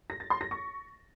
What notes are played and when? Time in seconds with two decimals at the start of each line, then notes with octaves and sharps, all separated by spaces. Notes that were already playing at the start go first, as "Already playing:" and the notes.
0.10 A#6
0.20 A6
0.30 C6
0.41 A#6
0.51 C#6